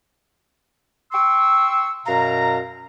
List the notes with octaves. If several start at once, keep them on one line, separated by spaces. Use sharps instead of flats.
G5 C6 C#6 E6
F#2 B2 F5 A#5